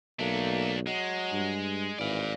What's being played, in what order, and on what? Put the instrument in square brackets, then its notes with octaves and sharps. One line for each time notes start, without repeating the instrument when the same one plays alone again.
[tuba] B1 [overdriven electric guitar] A3 D4 [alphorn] A#3
[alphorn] F#3 [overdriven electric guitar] G#3
[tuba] G2
[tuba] G#1 [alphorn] E3 [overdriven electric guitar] D5 F5